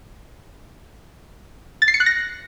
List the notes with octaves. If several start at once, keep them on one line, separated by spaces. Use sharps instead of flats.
A6
C7
C#7
F#6
A#6